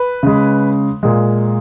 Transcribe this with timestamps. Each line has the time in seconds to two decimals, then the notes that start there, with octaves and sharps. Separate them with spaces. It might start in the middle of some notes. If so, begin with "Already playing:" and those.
Already playing: B4
0.23 C#3 G#3
1.03 A#2 G#3